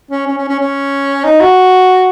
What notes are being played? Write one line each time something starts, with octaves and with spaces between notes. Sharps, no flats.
C#4
C#4
C#4
C#4
C#4
D#4
F#4